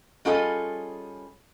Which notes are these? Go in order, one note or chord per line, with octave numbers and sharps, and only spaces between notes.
G3 C#4 F4 G#4 A4 D#5